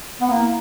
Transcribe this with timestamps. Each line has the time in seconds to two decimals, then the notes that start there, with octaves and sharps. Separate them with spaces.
0.21 B3
0.29 A#3 E4